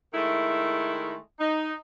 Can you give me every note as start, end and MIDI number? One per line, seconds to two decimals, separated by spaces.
0.14 1.15 51
0.14 1.15 56
0.14 1.15 57
0.14 1.15 64
1.39 1.73 63